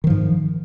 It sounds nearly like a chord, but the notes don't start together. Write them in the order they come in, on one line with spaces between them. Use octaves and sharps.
D#3 F3 G#2